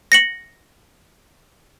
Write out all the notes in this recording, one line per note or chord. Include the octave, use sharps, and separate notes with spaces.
A#6 C#7 F#7